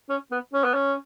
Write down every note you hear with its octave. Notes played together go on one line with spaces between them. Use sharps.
C#4
B3
C#4
B3
C#4